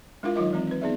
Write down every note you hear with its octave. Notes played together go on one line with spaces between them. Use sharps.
G#3 D4 E4 F4 A#4 F5
D#3 F#3 D#4 F4 A#4 D#5
E3 G#3 C4
C4 B4
B3 D#4 G#4 D5 E5